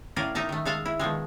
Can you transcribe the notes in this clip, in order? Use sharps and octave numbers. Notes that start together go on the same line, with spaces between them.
A2 C#4 A#4 D5 F5
D#4 A#4 E5 A5
D#3 A3
G#3 A4 F5 A5
E4
B2 D#3 F3 G#3